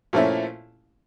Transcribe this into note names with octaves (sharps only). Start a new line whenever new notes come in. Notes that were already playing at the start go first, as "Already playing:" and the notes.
A#2 F3 A3 C#4 E4